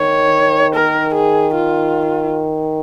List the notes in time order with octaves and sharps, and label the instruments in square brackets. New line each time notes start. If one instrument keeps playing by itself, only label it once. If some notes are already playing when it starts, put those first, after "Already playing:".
Already playing: [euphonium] D#3 [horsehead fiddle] C#5
[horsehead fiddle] A#4
G#4
F4